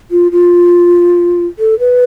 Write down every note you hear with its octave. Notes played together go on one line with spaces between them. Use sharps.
F4
F4
A4
B4